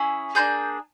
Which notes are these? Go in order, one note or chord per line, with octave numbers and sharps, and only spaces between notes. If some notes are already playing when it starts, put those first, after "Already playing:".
Already playing: C#4 E4 G#4
A#3 D4 F4 G#4 G6